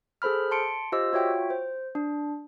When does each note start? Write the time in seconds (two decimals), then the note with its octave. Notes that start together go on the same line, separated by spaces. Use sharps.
0.22 G#4 A4 C5 B5 F6
0.51 A5 C6 C#7 D7
0.92 F4 G4 C5 D#5 E6
1.13 F4 F#4 C#5 E5 G5
1.50 C5
1.95 D4